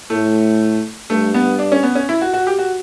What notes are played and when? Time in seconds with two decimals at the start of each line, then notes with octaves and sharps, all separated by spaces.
0.10 A2 A3
1.10 G2 A3
1.34 B3
1.59 D4
1.72 C#4
1.83 B3
1.95 C#4
2.09 E4
2.21 F#4
2.33 F#4
2.47 G4
2.59 F#4